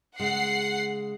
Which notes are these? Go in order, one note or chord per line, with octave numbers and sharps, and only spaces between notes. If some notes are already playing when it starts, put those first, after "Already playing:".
C#3 G#3 F#5 C7